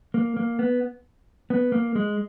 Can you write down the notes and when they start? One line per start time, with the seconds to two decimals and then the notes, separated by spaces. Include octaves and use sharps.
0.14 A#3
0.37 A#3
0.59 B3
1.50 B3
1.72 A#3
1.95 G#3